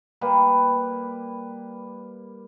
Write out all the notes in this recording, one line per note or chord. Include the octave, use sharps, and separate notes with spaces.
G3 A#3 B4